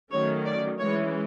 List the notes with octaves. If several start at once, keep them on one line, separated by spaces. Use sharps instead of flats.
D#3 F#3 A3 C#4 C#5
D5
E3 G#3 C#4 C#5